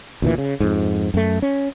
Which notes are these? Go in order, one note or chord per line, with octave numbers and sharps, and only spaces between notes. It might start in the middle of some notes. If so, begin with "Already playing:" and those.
D2 A#2 E3
C#3
F2 G#2
F#2 A3
C#4